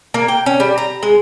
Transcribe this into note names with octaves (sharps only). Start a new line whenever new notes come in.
A#3
G5
C#4
G3
A#5
G#3